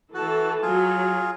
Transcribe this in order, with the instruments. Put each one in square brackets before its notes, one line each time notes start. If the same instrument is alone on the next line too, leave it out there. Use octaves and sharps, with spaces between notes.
[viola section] E3 A4 A5 [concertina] F#4
[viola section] F#3 [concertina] F4 G#4